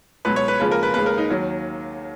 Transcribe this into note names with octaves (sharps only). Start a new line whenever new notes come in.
C#2 B2 F#3 B4
C#5
B4
D#2 C#3 F3 G#3 B4
A#4
B4
D#2 C#3 G#3 B4
A#4
D#4
D#2 D#3 F#3